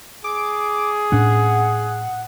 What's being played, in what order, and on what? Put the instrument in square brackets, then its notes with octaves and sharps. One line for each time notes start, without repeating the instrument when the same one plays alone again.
[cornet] G#4 [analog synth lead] D6
[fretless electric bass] A2 C#4 D4 [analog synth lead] F#5